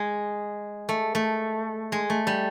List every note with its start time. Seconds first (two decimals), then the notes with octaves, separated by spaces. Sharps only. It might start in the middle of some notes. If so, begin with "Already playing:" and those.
Already playing: G#3
0.89 A3
1.15 A3
1.92 G#3
2.10 A3
2.27 G3